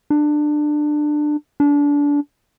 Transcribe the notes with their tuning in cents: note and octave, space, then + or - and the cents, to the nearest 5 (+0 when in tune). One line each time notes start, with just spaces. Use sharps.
D4 +20
D4 -25